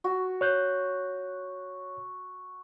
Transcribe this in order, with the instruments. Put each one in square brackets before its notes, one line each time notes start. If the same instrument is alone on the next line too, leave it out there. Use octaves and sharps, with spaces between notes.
[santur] F#4
[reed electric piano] C#5 F#6 G6